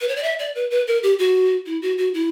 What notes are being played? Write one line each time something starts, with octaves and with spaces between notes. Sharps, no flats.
B4
C#5
D5
E5
D5
B4
B4
A#4
G4
F#4
E4
F#4
F#4
E4